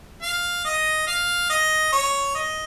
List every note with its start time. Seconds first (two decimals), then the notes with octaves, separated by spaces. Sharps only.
0.22 F5
0.65 D#5
1.07 F5
1.50 D#5
1.92 C#5
2.35 D#5